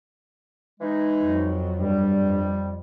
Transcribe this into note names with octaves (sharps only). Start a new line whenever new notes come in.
E3 G#3 D#4
F2 F#3
G2 G3
F2